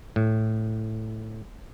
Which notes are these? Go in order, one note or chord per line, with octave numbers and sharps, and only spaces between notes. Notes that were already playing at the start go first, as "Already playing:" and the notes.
A2